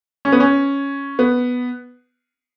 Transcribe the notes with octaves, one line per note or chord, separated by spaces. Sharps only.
C#4
B3
C#4
B3